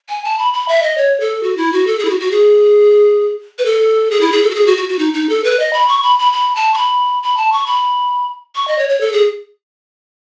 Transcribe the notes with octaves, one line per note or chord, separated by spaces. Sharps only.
G#5
A5
B5
B5
E5
D#5
C#5
A4
F#4
E4
F#4
A4
G#4
E4
F#4
F#4
G#4
B4
A4
G#4
E4
G#4
A4
F#4
G#4
F#4
F#4
F#4
D#4
D#4
A4
B4
D#5
B5
C#6
B5
B5
B5
A5
C#6
B5
B5
A5
C#6
B5
C#6
D#5
C#5
C#5
A4
G#4